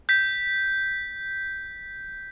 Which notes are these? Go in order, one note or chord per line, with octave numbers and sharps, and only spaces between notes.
G6 B6